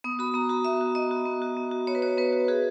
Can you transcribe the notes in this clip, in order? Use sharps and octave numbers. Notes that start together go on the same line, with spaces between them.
B3 D#6
F#4 B5
B3 A#5
F#4 B5
B3 E5
F#4
B3 D#5
F#4
B3
F#4
B3
F#4
B3 C#5
B4
F#4 C#5
B3 B4
F#4
F#4 G#4